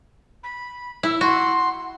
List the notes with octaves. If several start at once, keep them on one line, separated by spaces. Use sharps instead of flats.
B5
E4 E6
F#4 C6